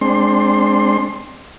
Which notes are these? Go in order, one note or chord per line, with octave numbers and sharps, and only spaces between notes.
G#3 C4 D4 C6